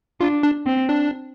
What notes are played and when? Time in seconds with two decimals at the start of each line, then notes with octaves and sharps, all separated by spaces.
0.20 D4 F4
0.43 D4
0.66 C4
0.89 D4